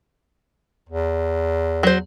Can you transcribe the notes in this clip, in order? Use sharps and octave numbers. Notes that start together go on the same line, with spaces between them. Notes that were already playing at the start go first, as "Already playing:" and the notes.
E2
F#3 C5